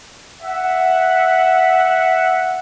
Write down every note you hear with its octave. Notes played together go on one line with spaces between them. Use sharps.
E5 F#5